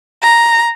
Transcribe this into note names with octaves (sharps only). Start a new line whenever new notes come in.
A#5